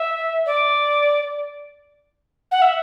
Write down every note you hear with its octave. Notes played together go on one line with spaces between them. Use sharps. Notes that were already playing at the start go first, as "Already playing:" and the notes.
Already playing: E5
D5
F#5
E5